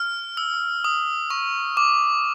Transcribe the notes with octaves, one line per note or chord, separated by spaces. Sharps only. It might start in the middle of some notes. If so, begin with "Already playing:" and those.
Already playing: F6
E6
D#6
C#6
D6